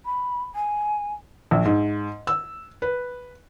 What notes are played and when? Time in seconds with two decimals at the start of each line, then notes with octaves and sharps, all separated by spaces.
0.05 B5
0.55 G#5
1.51 A#1
1.65 G#2
2.27 E6
2.82 B4